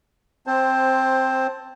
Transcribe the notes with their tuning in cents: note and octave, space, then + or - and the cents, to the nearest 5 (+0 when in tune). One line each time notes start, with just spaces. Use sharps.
C4 +0 C5 +15 A5 +0